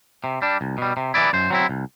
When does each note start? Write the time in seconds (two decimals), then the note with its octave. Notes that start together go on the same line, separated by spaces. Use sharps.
0.24 C3
0.42 G3 D4
0.61 C2
0.78 B2 G3
0.97 C3
1.14 E3 B3 E4 D5
1.33 F#2 C5
1.50 F#3 C4 E4
1.69 C2